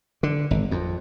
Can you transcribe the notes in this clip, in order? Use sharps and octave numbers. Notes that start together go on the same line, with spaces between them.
D3
G#1
F2